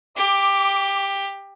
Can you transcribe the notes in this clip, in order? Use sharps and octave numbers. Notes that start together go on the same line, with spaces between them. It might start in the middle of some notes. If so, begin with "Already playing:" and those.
G4 D6